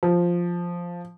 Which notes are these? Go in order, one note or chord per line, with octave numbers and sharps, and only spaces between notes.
F3